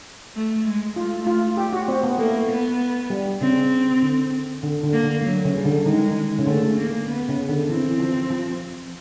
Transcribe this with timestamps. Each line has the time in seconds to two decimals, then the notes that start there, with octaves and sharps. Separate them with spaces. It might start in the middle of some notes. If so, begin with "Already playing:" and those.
0.36 A3
0.66 G#3
0.96 A3 F4
1.27 F4
1.57 G4
1.73 F#4
1.88 C4
2.03 B3
2.18 A3 A#3
2.50 B3
3.10 G3
3.41 C#3 C4
4.02 D3
4.63 D3
4.84 D3
4.93 A#3
5.04 D3
5.24 F#3
5.45 C#3
5.56 G3
5.65 D3
5.85 D#3 G#3
6.39 C#3
6.46 D3 A3
6.78 A#3
7.08 B3
7.28 C#3
7.49 D3
7.69 E3 C4
8.00 F3
8.30 F3